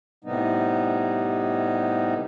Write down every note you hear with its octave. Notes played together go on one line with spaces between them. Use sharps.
A2 C3 G3 B3 D#4